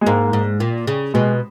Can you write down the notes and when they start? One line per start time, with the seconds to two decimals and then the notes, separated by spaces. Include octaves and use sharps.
0.01 G#3
0.06 G#2 A#3
0.33 G#2
0.60 A#2
0.87 C#3
1.14 B2 G#3